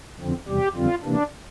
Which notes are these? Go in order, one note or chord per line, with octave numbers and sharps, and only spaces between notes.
F2 D3 F3 C4
E2 C3 G3 G4
F2 D3 G3 C4 F4
C3 E3 A#3 D4